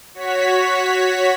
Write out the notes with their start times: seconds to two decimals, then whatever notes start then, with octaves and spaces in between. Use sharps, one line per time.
0.14 F#4 C#5 B6